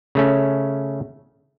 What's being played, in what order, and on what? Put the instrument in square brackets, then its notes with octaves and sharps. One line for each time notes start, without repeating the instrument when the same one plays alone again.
[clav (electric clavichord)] C#3 A3 C#4